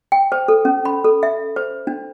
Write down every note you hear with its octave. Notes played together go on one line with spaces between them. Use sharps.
G5
C5
A4
C#4
B5
A4
E5
C5
D4